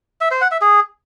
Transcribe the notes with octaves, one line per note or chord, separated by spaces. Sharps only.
E5
C5
F#5
E5
G#4